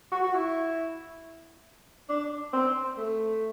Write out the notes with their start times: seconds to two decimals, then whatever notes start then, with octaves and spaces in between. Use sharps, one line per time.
0.12 F#4
0.24 F#4
0.34 E4
2.09 D4
2.53 C4
2.97 A3